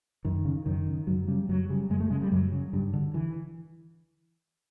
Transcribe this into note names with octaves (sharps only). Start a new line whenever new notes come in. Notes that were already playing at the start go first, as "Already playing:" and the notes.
F#2 D#3
C#3
F#2 D#3
C#3
F#2 F#3
C#3 G3
F#2 F#3
C#3 G3
F#2 G#3
A3
C#3 G#3
G3
F#2 F#3
C#3
G2
D3
E3